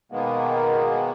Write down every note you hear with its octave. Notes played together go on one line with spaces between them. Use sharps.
B2 D#3 G#3 A#3 B3